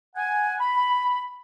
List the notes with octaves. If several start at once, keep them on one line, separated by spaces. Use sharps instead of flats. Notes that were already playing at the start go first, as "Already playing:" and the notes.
F#5 G#5
B5